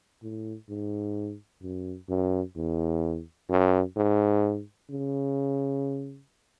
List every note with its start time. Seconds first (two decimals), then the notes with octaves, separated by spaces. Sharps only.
0.23 A2
0.69 G#2
1.63 F#2
2.09 F#2
2.56 E2
3.50 F#2
3.96 G#2
4.90 C#3